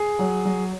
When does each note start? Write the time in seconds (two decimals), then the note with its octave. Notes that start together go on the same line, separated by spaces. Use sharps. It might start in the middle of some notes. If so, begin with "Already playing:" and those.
Already playing: G#4
0.19 F#3
0.45 F#3